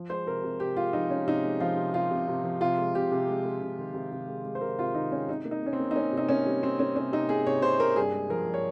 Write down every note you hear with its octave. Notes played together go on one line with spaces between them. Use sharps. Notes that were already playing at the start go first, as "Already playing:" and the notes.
Already playing: F3
G#3 C5
C3 A#4
C3
C3 G4
G#3 F4
F3 D#4
G#3 C#4
C3 D#4
G#3
F3 F4
C3
C3 F4
C3
C3
F3
C3 F4
G#3
C3 G4
C3
G#3
G#3
C3
D#3
C3
C3
G#3
G#3
C5
C3 A#4
C3 F4
D#3 D#4
G#3 C#4
C3 D#4
A#3
D#4
A#3 C#4
C4
A#3
D#4
A#3 C#4
C3
D#4
A#3 C#4
G3
G3 C4
A#3 C#4
C3 C#4
C3 D#4
A#3 G#4
C3 C#5
C3 C5
A#3 A#4
G2 G#4
G#3
F3 A#4
F3
C#5